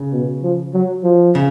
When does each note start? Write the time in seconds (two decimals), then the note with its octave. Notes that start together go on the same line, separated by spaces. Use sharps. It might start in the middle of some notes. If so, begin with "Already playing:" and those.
Already playing: C#3
0.12 B2
0.43 F3
0.74 F#3
1.03 F3
1.35 C#3